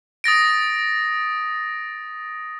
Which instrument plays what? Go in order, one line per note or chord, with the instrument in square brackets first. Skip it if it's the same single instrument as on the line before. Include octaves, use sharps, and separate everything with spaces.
[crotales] D#6 A6 A#6 D7